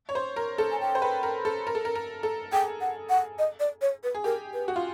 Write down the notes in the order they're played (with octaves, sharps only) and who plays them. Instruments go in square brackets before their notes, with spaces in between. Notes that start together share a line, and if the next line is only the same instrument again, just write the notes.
[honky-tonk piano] C#5
C5
A#4
A4
[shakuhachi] G#5
G5
[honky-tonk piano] C5
B4
A#4
A4
A#4
A4
A#4
A#4
A4
[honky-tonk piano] G#4 [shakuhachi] G5
[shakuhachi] F#5
F#5
D#5
D5
C#5
B4
[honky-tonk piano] G#4
[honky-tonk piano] G4 [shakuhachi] A#4
[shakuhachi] B4
[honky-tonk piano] F#4
F4